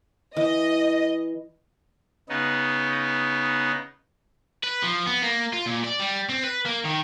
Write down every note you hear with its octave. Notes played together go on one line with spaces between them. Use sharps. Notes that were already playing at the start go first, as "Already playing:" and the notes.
E3 D#5
C#3 B3 D#4
B4
F3
B3
A#3
F4
A#2
D5
G3
C4
B4
A#3
D#3